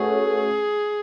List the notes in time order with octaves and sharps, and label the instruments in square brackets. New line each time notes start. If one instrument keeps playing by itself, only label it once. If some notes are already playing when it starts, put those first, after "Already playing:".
Already playing: [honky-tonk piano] A3 C#4 F#4 B4 [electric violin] G#4